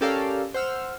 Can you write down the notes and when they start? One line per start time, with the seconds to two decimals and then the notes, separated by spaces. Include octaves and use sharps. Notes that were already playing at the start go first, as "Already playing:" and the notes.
0.01 C#4 G4 A4 A#4 D5 F5
0.54 C5 F#5 E6 F6